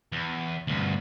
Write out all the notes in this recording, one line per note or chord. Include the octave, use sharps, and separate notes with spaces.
E2
D2 G2